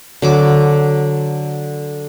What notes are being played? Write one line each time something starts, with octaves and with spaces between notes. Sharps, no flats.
D3 F#3 D6